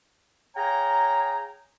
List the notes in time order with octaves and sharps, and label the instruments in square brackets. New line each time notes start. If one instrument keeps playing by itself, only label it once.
[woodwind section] G#4 C#5 F5 G5 G#5 A#5